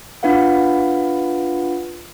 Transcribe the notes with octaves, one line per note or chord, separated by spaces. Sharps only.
D4 F4 B4 F5 F#5